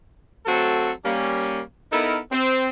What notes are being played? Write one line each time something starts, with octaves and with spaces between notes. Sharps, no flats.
F#3 A3 C4 F#4 A4
G3 A#3 C#4
B3 D#4 E4 A4 A#4
C4